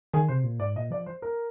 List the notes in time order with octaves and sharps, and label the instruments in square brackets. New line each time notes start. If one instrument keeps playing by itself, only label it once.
[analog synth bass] D#3 [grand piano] G#4
[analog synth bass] C3 [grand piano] C5
[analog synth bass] A#2
[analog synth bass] G#2 [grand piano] D5
[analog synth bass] A#2 [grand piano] D#5
[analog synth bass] F3 [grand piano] D5
[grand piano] C5
A#4